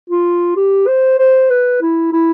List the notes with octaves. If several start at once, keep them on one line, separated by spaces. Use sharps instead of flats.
F4
G4
C5
C5
B4
E4
E4